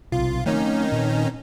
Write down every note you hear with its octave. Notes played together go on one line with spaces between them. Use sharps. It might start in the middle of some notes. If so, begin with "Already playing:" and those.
B1 C3 F4
D#3 A3 C4 C#4 D#4
A#2 C4